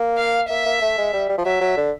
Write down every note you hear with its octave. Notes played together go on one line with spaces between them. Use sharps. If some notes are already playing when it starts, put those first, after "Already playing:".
Already playing: A#3
F5
A#3 E5
A#3
A3
G#3
G3
G3
F3
F#3 E5
F#3
D3